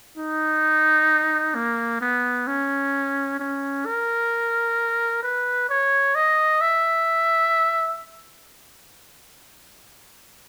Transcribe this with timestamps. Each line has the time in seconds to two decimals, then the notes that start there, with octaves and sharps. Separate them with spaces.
0.17 D#4
1.55 A#3
2.01 B3
2.47 C#4
3.39 C#4
3.86 A#4
5.23 B4
5.70 C#5
6.15 D#5
6.61 E5